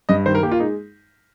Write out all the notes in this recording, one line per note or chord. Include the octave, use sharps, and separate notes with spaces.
G2 D#5
D#3 C5
A#4
A#3 G4
F4
G#3 D#4